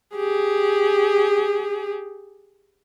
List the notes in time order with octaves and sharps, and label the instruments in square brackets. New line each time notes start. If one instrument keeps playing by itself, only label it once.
[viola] G4 G#4